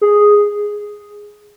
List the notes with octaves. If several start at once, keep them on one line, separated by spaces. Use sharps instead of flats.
G#4